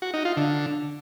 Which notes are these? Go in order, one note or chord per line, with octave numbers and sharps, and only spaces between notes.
F#4
D#4
F4
D3